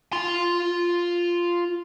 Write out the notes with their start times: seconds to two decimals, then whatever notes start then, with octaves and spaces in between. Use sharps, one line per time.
0.13 F4 C6